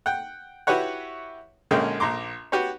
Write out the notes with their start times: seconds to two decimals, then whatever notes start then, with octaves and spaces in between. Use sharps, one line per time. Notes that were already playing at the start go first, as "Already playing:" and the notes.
0.06 F#5 G5
0.67 E4 F#4 G4 B4 C#5 F#5
1.71 A#1 D3 G#3 A#3 C#4 G5
2.00 A#1 A#5 C6 D6
2.52 F#4 G4 B4 C#5